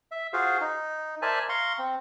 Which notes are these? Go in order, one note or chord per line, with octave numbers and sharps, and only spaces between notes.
E5
F4 F#4 G#4 C5 F5
D#4
A#4 C5 D5 E5 G#5 A5
F5 A#5 C6 C#6
C4